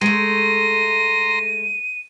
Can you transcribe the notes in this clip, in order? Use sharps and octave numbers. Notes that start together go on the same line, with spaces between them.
G#3 A3 A#5 C6 D#7